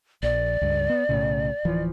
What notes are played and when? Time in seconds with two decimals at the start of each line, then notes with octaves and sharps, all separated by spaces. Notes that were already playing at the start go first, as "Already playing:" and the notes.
0.23 A#1 D5
0.61 C#2 G2
0.90 B3
1.09 B1 A2 C#3
1.65 D1 E3 F3